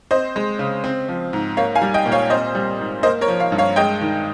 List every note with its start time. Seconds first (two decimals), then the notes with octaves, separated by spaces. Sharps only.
0.11 C4 C5 D#5
0.36 G#3
0.59 C#3
0.84 C4
1.08 F3
1.33 G#2
1.57 A#3 C#5 F5
1.75 F5 G#5
1.81 G3
1.94 D#5 G5
2.06 A#2
2.12 C#5 F5
2.30 C4 C5 D#5
2.55 G3
2.80 G#2
3.03 A#3 C5 D#5
3.21 A#4 C#5
3.28 F3
3.40 C#5 F5
3.52 G2
3.58 C#5 F5
3.76 G#3 D#5 G5
4.01 D#3